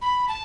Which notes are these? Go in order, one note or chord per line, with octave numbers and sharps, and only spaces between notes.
B5
A5